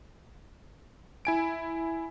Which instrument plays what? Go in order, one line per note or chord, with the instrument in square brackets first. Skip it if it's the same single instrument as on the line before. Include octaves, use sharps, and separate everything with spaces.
[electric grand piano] E4 G#5 D7